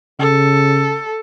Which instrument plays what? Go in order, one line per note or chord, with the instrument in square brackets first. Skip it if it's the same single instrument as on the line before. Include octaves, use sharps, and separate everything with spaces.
[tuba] C#3 [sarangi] A4